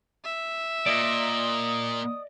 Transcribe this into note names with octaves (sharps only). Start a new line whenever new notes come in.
E5
A#2 D5 D#5 D#6